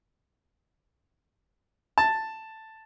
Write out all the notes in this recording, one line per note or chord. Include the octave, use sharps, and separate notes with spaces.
A5